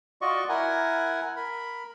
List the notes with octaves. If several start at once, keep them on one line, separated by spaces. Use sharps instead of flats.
F4 F#4 D5 D#5 C#6
E4 A#4 F#5 G#5
A#4 B5